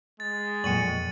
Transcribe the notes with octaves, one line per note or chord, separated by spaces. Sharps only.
G#3 A6
F2 A#2 F#3 A#3 G#5 C#7 D#7 F#7